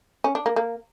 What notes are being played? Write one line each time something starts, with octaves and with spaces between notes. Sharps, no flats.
C#4
D4
A#3
A#3